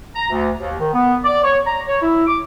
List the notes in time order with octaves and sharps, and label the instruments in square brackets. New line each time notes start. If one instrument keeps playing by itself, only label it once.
[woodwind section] A#5
D2
D#2
D#3
B3
D5
C#5
A#5
C#5
E4
D6